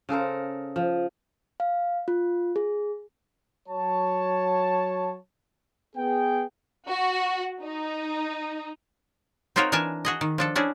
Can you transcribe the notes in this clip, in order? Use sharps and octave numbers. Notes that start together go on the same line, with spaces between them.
C#3 A4 A#4 C5
F3
F5
F4
G#4
F#3 C#5 A5
B3 G#4 G5
F#4
D#4
C4 D#4 F4 F#4 A#4 C#5
E3 D4 A#4 G#5 A5
F#4 G#4 D#5
D#3
F3 D4 A4
C#4 D4 E4 G#4